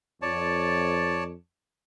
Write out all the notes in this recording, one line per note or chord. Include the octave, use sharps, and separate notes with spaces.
F2 C#5 D5 A5